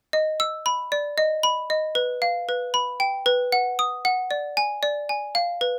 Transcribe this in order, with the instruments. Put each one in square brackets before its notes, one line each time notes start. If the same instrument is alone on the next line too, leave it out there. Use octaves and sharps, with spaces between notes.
[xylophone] D#5
E6
B5
D5
D#5
B5
D#5
B4
F5
B4
B5
G5
B4
F#5
D#6
F#5
D5
G#5
D5
G#5
F5
B4